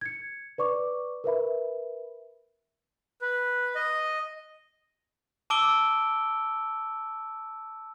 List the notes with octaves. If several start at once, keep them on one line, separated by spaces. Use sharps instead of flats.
G#6 C#7
B4 D5 C#6 D6
A#4 B4 E5 B5
B4
D#5
A5 D6 E6 D7 G7